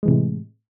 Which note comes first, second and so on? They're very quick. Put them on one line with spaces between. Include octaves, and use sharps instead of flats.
G#3 E3 C3 A2